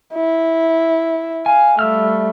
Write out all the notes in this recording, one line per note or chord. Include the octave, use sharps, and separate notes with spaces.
E4
F5 G#5
G3 A3 E6 F6